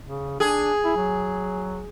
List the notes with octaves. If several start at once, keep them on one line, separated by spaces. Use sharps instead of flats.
C#3
D4 G#4
E4
F#3